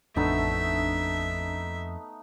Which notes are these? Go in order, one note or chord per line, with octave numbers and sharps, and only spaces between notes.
A1 F2 A3 B3 D4 D#4 E5 A5